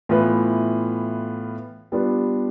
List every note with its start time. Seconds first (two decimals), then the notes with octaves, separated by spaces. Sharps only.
0.09 A2 E3 B3 F4 B4
1.92 G3 B3 D4 F4 B4